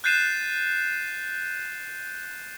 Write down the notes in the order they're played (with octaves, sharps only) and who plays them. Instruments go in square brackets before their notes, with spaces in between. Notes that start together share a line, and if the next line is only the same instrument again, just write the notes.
[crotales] F#6 G6 A6 C7 D#7 E7